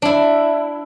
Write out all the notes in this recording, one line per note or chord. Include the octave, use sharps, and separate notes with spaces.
D4 E4